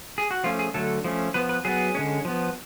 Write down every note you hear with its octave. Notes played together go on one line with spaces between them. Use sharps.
G#4
F#4
F3 A3 C#4 F4
G#4
D3 F#3 A3 A4
F3 A3 C#4
F3 B3 B4
B4
F#3 B3 G#4
D3 G#3 C#4
F3 B3